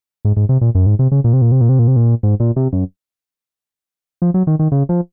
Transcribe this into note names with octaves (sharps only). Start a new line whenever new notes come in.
G#2
G#2
C3
A#2
F#2
G#2
C3
C#3
A#2
C3
A#2
C3
A#2
C3
A#2
C3
A#2
G#2
A#2
C3
F#2
F3
F#3
D#3
D#3
C#3
F3